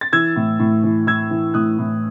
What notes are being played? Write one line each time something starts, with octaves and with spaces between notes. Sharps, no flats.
A6
E3 E6 G#6
A2
A2
E3
E3 E6 G#6
E3
A2 D#6 F#6
A2